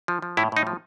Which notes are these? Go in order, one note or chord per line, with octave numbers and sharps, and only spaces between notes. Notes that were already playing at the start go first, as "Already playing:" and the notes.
F3
F3
A2 E4
A2 D#4
F3